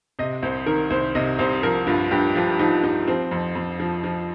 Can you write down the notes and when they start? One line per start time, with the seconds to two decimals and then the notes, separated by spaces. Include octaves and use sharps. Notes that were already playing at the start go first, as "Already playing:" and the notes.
0.19 C3 D#5
0.42 C2 C5
0.66 D#3 A#4
0.90 C2 C5
1.15 C3 D#5
1.39 C2 C5
1.63 F3 A#4
1.87 G2 F4
2.11 G2 G4
2.35 F3 F4
2.59 F3 D#4
2.83 G2 D#4
3.08 F3 C4
3.31 F2
3.55 F2
3.80 F3
4.04 F3